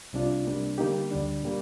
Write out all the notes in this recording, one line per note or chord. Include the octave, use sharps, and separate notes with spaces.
C2 C3 G3 D4 F4
C3 G3 A#3 D4
D3 G3 A#3 D#4 G4
D2 D3 G3 D4
A#2 G3 A#3